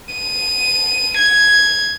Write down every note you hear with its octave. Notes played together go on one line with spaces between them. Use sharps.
D#7
G#6